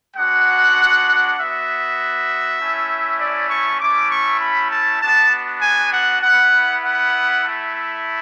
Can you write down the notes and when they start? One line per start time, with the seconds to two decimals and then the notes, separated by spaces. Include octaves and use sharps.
0.16 G#3 D4 F#4 F#5
1.37 B3 F#4 E5
2.58 A3 C#4 E4
3.20 D5
3.49 C#6
3.80 A3 C#4 E4 D6
4.11 C#6
4.40 B5
4.71 A5
5.01 B3 D4 F#4 A5
5.62 G#5
5.93 F#5
6.22 B3 E4 F#5
6.83 F#5
7.44 A3 E4